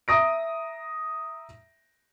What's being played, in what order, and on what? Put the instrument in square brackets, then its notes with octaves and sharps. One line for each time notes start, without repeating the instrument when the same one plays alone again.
[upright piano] E5 A#5 D#6 A#6 D7